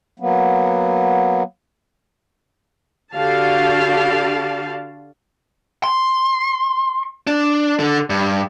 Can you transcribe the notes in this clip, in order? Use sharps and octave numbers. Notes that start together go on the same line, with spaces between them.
F#3 A#3 B3
D3 F#4 G4 D5 F5 A5
C6
D4
D3 A4
G2